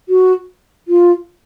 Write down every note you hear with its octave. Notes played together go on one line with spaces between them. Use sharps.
F#4
F4